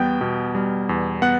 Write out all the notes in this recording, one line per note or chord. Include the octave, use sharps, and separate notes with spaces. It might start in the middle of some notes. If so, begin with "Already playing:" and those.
Already playing: E2 G3 B3 G5 G6
B2
G3
E2
B3 F#5 F#6